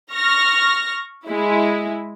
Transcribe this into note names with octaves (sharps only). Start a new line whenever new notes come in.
C#6 F6 A#6
G#3 E4